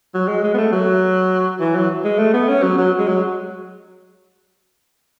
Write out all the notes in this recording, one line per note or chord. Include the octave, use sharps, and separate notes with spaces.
F#3
G#3
G#3
B3
A3
F#3
E3
F#3
G#3
A3
B3
C#4
F#3
F#3
G#3
F#3